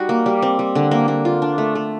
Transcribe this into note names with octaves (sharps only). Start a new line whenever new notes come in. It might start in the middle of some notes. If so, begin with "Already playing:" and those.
Already playing: G3 D#4 F#4
A#3
G3
C4
G3
D3
A#3
A#3
F4
D4
A3
A3